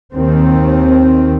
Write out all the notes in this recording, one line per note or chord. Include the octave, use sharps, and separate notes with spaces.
D#2 D#3 C4